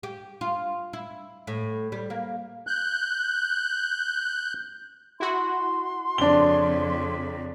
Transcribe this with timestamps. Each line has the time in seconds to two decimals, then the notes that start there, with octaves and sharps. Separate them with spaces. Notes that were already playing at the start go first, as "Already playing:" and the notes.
0.03 G4
0.41 F4
0.93 E4
1.47 A2
1.92 G3
2.10 A#3
2.67 F#6 G6
5.20 E4 F#4 C6
6.18 F2 C#3 D4 G7